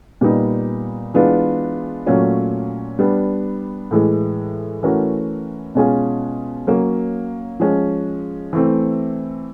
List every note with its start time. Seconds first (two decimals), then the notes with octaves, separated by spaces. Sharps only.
0.21 A#2 G3 B3 D#4
1.14 E3 G#3 B3 D4 F4
2.06 A#2 F#3 A3 C#4 F4
2.99 G3 B3 D4
3.91 A2 E3 G#3
4.83 E3 A3 C#4 F#4 A#4
5.75 B2 G#3 C#4 F4 G#4
6.67 F#3 A#3 C#4
7.60 F3 G#3 C#4
8.53 E3 A3 C4